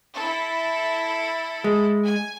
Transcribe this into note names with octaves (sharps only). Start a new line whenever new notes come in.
E4 A4
G#3
G#5